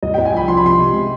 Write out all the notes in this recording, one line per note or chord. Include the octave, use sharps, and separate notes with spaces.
C2 D#5
C2 G5
G#5
F3 B5
F3 C6
B5
C3 C6
C3
G#3